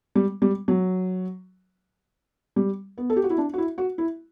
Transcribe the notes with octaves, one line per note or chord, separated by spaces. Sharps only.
G3
G3
F#3
G3
B3
A4
G4
F#4
E4
D4
F#4
E4
F#4
E4